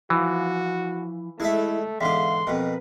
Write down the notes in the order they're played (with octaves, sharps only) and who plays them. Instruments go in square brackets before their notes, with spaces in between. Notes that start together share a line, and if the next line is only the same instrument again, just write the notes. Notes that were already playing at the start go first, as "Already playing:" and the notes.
[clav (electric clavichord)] E3 [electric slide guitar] F3 E4 F5 [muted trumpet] F#4
[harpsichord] G#3 A4 E5 [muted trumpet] A3 [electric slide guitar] E4
[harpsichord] E2 G#2 D3 [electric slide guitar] E5 F5 [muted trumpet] C6
[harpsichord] F2 B2 [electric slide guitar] A#4 B4